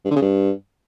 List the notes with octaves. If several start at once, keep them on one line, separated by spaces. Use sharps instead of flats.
G2
D3
C#3
G2